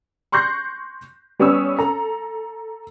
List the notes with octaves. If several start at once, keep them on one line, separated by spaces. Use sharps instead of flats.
C6 C#6 F#6 G6 A#6 C7
G3 B3 C#4 C#5 D#6 E6
A4 A#5